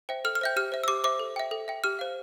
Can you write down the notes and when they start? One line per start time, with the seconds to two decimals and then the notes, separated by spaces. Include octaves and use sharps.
0.09 C5 E5 G5
0.25 A4 F6
0.35 F6
0.41 C5 E5 G5 G6
0.56 G4 F6
0.72 C5 E5
0.84 E6
0.88 G4 D6
1.04 C5 E5 D6
1.19 A4
1.36 E5 G5
1.51 A4
1.68 E5 G5
1.84 G4 F6
1.99 C5 F5